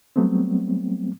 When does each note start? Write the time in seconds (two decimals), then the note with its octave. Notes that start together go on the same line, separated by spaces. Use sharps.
0.16 F#3 G3 A3 B3 C4